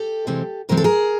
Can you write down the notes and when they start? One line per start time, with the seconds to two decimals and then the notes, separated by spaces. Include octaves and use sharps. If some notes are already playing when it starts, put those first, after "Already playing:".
Already playing: G4 A4
0.27 C3 E3 G#3 C4
0.69 C3 E3 G#3 C4 A#4
0.77 A4
0.84 G#4 A#4